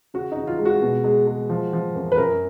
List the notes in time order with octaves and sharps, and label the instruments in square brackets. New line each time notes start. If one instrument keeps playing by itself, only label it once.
[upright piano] C#3 F#4
D#4
C#3
F4
G#3
F#4
B2
G#3
G#3
F3
F3
F#2
B4
F#2 A#4